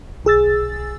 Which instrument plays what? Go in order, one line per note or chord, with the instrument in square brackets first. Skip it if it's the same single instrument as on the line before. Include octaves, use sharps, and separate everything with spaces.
[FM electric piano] B1 G#4 E6 A6